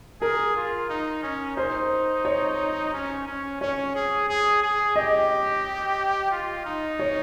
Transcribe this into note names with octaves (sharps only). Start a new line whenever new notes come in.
G#4 A#4
F4
D#4
C#4
D#4 C5
C#5
C#4
C#4
C#4 C#5
G#4
G#4
G#4
G4 D#5
F4
D#4
C#5